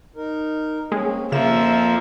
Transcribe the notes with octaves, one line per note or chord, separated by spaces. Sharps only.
D#4 A#4
G#3 A#3 C4 C#4
F2 C#3 F3 A#3 F4 E5 E7